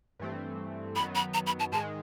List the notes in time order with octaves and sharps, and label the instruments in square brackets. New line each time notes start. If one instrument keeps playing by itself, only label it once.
[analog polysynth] G2 E3 A3 C4
[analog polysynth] F#2 D#3 F#3 B3 [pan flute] B5
[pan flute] B5
A#5
B5
A5
[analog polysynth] G#2 D#3 G#3 [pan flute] A5